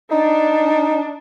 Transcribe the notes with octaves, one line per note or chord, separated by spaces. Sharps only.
D4 D#4